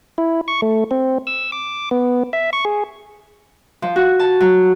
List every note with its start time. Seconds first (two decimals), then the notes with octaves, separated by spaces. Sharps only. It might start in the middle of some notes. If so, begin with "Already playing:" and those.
0.18 E4
0.48 C#6
0.62 A3
0.91 C4
1.27 E6
1.52 D6
1.91 B3
2.33 E5
2.53 C#6
2.65 G#4
3.82 F3
3.96 F#4
4.19 A5
4.40 F#3